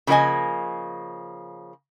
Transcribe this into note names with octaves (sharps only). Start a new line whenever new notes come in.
C#3 F3 A#3 F#4 D#5 G#5